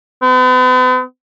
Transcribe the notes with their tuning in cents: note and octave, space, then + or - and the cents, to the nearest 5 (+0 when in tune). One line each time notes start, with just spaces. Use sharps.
B3 +45